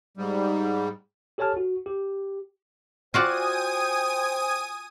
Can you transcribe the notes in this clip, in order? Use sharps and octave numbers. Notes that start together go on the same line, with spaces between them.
G#2 G3
G4 A4 C#5 G#5 A5 F6
F#4
G4
F4 F#4 C5 D5 G5 G#5 D#6 D#7